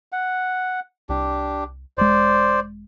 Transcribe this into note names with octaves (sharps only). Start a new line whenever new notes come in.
F#5
C2 D4 G4
E1 G#3 C5 D5